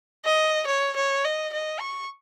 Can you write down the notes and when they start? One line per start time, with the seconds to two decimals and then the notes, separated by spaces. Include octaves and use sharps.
0.25 D#5
0.67 C#5
0.96 C#5
1.25 D#5
1.53 D#5
1.80 C#6